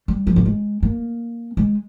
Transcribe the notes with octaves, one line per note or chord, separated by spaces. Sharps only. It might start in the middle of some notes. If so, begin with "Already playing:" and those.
G3
F3
A#3
G#3
A#3
G#3